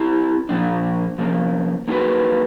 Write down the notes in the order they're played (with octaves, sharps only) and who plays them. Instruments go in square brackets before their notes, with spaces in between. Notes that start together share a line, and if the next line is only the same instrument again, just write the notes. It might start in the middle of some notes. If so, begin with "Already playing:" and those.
Already playing: [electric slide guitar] C4 E4 G4
A#2 F3 A#3 D4
C3 F3 A#3
A#3 D#4 F#4 B4